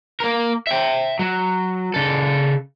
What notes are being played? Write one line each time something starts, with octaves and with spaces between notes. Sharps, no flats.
A#3 A#4
E5 G5
F#3
C#3 A4